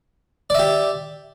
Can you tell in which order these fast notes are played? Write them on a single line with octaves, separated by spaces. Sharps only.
D5 E5 G4